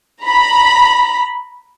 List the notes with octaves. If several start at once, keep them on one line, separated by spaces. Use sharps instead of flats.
A#5 B5